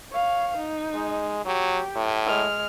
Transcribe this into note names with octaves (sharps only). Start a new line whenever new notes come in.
C#5 F5
D#4
G#3
F#3 G4
A2
G#3 F6